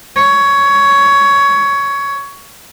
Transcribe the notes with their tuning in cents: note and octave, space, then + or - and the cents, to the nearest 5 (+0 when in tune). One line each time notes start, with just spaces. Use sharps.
C#5 +15